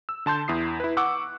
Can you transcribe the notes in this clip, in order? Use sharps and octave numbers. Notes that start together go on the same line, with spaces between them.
E6
D3 A5 C6 G6
E2 E4 D#6 C7
E4 B4
F#5 C#6 D6 E6 F#6